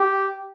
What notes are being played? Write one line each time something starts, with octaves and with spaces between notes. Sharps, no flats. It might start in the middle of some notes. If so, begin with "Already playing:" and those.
Already playing: G4